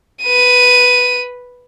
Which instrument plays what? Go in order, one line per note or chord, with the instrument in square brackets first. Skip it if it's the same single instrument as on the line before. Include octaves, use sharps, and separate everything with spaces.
[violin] B4 D#7